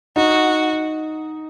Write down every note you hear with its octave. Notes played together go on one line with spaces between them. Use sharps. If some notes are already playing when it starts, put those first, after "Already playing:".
D#4 F#4